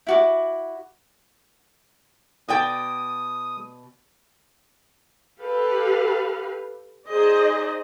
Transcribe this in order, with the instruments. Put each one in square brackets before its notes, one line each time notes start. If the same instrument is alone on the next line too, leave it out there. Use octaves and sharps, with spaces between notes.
[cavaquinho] E4 F#4 D6
[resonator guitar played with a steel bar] B2 D5 G5 [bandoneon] D#6
[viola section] G4 A4 B4 F5
D#4 G#4 C5 D5 D#5